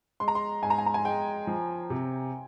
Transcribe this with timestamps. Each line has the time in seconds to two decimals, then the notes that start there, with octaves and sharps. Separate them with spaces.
0.20 G#3 C6
0.28 A#5
0.35 C6
0.62 G#2 G#5
0.70 A#5
0.78 G#5
0.86 A#5
0.94 G#5
1.05 G#3 G5
1.47 F3
1.90 C3